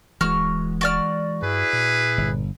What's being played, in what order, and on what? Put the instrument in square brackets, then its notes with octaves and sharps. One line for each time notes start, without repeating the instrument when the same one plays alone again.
[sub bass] D1 [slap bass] E3 G#3 [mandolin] F#4 F6
[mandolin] F#4 D5 F6
[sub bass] G2 [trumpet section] E4 G#4 B4
[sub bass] A#2
[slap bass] G1